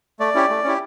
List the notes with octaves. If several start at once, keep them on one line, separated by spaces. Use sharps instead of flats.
A3 D5
C#4 E4 G4
A3
C#4 E4 G4